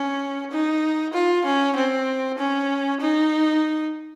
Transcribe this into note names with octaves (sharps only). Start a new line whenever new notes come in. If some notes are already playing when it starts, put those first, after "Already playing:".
Already playing: C#4
D#4
F4
C#4
C4
C#4
D#4